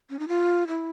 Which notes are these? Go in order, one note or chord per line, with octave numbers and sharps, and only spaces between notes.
C#4
D#4
F4
E4